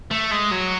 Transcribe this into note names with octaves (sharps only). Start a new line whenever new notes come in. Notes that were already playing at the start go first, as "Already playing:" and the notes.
A3
G#3
F#3